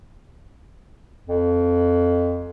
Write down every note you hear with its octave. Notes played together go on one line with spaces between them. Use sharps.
F2